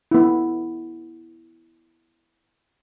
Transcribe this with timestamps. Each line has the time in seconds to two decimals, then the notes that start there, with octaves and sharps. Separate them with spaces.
0.11 B3 E4